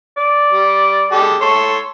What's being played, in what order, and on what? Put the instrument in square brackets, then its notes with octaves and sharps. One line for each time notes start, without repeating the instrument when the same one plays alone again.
[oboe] D5
[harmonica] G3
G#3 G4 A4
[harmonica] A4 C#5 [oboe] C6